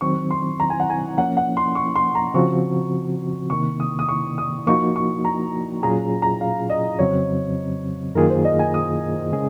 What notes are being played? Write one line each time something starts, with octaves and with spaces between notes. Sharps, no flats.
D#3 F#3 C4 C#6
C6
A#5
G#5
F#5
G#5
F3 A#3 C#4 F#5
F#5
C6
C#6
C6
A#5
C#3 F3 C4 F#4 C#6
C3 D#3 A#3 C#6
D#6
D#6
C#6
D#6
F3 A#3 D#4 F#4 C#6
C#6
A#5
A#2 F#3 C#4 F4 G#4 A#5
A#5
F5
D#5
F2 C#3 F#3 C4 C#5
F#2 D#3 A#3 F4 G#4 A#4
C5
D#5
G#5
D#6
C#3 G#3 C#4 G#4